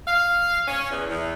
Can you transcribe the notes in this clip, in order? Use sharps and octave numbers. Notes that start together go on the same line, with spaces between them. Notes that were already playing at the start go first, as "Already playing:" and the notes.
F5
C#4
E2
E2